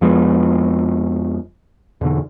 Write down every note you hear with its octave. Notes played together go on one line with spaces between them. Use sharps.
F2 F3 G#3 B3
E2 B2 D3